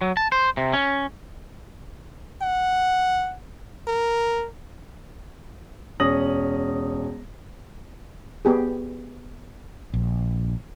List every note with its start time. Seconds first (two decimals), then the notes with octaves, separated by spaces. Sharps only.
0.01 F#3
0.17 A5
0.32 C5
0.57 C3
0.73 C#4
2.42 F#5
3.87 A#4
6.00 E1 C#4 D#6 A#6 F#7
8.45 B3 G4 G#4
9.94 A#1